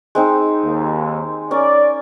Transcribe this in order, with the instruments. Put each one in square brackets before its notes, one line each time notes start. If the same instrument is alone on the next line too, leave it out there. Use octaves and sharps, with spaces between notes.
[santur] G#3 C4 D#4
[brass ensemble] D#2
[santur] C#4 A#4 [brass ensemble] D5